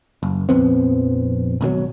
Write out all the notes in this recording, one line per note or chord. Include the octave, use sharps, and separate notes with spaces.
F#1
A#1 F2 B3 C4
G#1 B2 D3 F#3